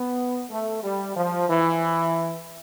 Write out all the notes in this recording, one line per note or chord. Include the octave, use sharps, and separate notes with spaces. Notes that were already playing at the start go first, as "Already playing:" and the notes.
Already playing: B3
A3
G3
F3
E3